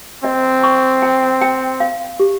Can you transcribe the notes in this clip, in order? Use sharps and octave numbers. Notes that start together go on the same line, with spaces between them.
C4 D#5
C#6
G5
G5
F5
G4